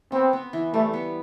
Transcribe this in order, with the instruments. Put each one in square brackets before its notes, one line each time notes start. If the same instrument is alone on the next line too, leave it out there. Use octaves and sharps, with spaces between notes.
[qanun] B3 [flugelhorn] C4
[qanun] B3
E3
[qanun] G3 [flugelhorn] A3
[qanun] B3